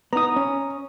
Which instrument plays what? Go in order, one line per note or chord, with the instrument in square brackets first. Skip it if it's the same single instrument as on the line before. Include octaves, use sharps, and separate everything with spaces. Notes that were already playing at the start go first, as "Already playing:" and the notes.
[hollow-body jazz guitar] B3 D#4 [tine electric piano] A#5 D#6
[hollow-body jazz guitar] C#4